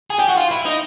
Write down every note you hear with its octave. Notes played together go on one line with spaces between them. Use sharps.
G#4
G4
F#4
F4
E4
D#4